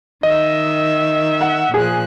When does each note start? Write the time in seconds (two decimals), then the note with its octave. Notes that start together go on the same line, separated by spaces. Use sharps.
0.23 D#3 D#5 E5
1.41 F#5
1.74 A#2 F3 G#4 F#6